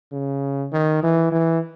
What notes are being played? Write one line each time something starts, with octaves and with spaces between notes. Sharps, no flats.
C#3
D#3
E3
E3